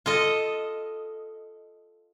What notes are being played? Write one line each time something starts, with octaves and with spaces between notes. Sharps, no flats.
F4 A4 D#5